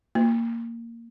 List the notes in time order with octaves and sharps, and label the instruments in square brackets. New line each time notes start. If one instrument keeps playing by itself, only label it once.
[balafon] A#3